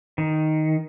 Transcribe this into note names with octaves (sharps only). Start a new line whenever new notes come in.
D#3